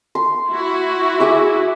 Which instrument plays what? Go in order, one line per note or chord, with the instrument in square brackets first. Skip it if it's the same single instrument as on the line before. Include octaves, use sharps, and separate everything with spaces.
[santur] C6
[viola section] E4 F#4
[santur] G#4 E5 D6